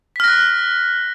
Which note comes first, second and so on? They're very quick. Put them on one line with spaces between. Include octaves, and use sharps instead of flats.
B6 F6 A#6 F#6